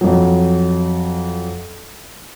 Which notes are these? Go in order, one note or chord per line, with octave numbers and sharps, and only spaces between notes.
F2 F#3